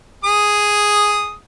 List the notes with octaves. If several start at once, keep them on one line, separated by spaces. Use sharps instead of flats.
G#4 D#6